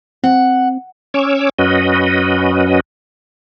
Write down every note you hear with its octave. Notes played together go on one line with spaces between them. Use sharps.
C4 F#5
C#4 C#5 D6 E6
F#2 C#4 F#4 B4 D#5